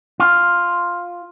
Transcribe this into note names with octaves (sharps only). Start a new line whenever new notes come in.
F4